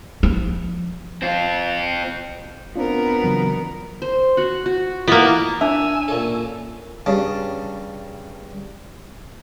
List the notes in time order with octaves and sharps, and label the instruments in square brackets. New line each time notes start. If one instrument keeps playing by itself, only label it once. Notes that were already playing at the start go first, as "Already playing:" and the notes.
[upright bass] F3
[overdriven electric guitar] C4 F4
[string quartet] B3 A#4 [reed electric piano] C4 D4 F4
[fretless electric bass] C#3 E3 F#3
[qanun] C5
F#4 F#5
F#4
[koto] A#3 B3 [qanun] E4 F4 D#5
[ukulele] D4 C#5 [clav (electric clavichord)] E5 [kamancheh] G#5 E6 [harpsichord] A#5
[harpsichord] A#2 C#4 A4
G2 C#3 A5